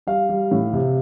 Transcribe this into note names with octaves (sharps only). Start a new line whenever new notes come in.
G3 F5
G3
A2
C3